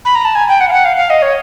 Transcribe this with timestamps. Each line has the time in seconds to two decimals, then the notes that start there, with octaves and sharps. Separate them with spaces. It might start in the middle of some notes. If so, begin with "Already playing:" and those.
0.05 B5
0.15 A#5
0.25 A5
0.35 G#5
0.48 G5
0.60 F#5
0.69 F5
0.72 F#5
0.85 F5
0.97 F5
1.10 D#5
1.22 C#5